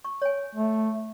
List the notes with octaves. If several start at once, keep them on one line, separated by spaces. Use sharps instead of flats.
C#6
C#5 G#5
A3